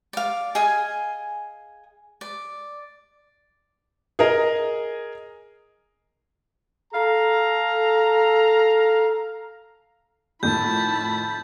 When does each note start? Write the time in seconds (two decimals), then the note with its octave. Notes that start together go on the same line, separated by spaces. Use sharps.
0.13 D5 F5
0.55 G#4 D#5 F5 G#5
2.21 D5
4.19 G#4 A#4 D#5
6.94 A4 F5 A#5
10.43 F2 A2 D#3 E4 A5 B5 G6